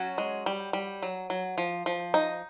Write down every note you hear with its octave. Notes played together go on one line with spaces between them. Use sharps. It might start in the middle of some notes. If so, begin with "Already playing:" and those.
Already playing: F#3 C#4 F#4
G#3
G3
G3
F#3
F#3
F3
F3
D#4